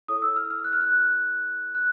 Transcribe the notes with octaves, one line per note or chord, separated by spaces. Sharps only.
E4 A4 C#5 D#6
E6
F6
F6
F#6
F6
F#6
F#6